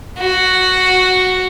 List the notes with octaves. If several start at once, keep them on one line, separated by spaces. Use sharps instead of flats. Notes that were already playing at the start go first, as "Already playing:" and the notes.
F#4